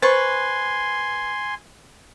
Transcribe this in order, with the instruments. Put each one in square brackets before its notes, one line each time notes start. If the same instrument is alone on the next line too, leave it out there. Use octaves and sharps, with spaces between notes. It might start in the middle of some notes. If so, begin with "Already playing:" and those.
[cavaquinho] B4 C#6 [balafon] C5 [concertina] G#5 C6